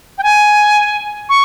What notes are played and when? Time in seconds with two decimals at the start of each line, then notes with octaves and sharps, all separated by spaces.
0.18 G5
0.23 G#5
1.29 C#6